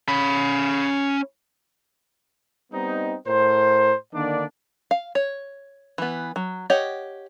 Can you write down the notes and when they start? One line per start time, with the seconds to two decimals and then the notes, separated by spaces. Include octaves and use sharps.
0.08 C#4 B5
2.72 G3 B3 C4 D#4
3.26 A2 A#4 C5
4.14 D3 D#3 A#3 D4 D5
4.91 F5
5.15 C#5
5.98 E3 B3
6.36 F#3
6.70 G4 C#5 D#5 F#5